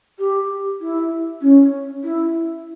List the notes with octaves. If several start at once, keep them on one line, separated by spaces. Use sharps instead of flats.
G4
E4
C#4
E4